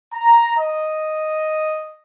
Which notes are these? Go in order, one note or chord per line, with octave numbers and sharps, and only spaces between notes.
A#5
D#5